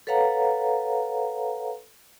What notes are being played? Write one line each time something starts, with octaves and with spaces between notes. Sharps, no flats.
A4 B4 C#5 F5 F#5 A#5